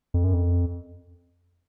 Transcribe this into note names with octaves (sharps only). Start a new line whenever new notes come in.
F2
F#2
F2